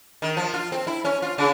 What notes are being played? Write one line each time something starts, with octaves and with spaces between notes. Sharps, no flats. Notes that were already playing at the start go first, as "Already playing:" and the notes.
D#3
F3
F4
C4
E4
C#4
F4
C#3